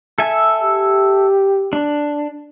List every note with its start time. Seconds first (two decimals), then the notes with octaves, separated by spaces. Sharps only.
0.18 A4 E5 G#5
0.62 G4
1.73 D4